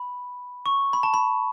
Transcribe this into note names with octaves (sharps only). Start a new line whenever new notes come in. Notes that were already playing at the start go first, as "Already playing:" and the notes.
Already playing: B5
C#6
B5
A5
B5